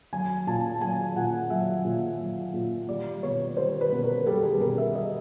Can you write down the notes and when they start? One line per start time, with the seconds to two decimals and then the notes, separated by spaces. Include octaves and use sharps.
0.13 F#3 G#5
0.47 A#2 A5
0.81 F#3 G#5
1.16 A#2 F#5
1.50 F#3 E5
1.85 A#2
2.20 F#3
2.54 A#2
2.89 G3 D5
3.23 B2 C#5
3.57 G3 C5
3.81 B4
3.92 B2
4.04 A#4
4.26 G3 A4
4.43 G#4
4.61 B2 A#4
4.78 E5
4.95 G3 D#5